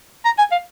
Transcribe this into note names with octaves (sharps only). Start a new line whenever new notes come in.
A#5
G#5
F5